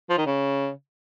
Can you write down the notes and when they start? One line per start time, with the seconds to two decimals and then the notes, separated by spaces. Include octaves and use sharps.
0.10 F3
0.18 D#3
0.26 C#3